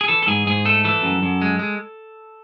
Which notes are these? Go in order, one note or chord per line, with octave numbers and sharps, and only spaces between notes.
G#4
E3 A4
A4
G#2 G#4
G#2 G#4
A3 A4
E3 A4
F#2
F#2
G#3
G#3